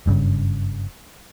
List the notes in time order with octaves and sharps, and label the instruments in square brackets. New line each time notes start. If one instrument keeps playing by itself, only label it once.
[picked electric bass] F#1 G2 A#2 C#3